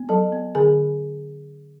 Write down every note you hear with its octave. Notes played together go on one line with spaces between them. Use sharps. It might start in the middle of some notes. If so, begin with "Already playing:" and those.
Already playing: B3
F#3 A4 A5
B3
D3 G#4 G#5